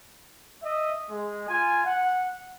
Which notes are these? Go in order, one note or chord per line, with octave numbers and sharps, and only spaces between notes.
D#5 E5
G#3
F4 G#5
F#5